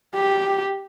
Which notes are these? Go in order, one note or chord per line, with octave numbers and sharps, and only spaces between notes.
G4